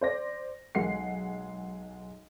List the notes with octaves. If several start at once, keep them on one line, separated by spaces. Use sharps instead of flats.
C5 D5 A#6
B1 G#3 F#5 C7